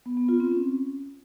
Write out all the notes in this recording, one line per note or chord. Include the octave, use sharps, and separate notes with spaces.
B3
B3
F4
C4
C#4